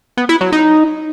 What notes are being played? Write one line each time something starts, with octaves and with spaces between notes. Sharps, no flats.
B3
E4
F#3
D#4